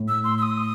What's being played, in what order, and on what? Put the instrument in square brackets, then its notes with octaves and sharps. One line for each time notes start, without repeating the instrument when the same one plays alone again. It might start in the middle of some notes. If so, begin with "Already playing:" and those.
Already playing: [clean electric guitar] A2
[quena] E6
C6
E6
D#6